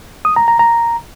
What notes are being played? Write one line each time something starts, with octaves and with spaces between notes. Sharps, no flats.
D#6
A#5
A#5
A#5